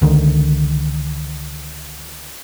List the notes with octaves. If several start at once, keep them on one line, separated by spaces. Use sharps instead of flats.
C#2 D3 D#3